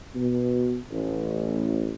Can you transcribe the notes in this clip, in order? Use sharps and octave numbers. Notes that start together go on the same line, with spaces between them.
B2
A1